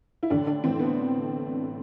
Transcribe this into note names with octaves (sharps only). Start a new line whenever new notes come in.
E4
A1 D3 D4
D3 D4
A2 E3 C4
B3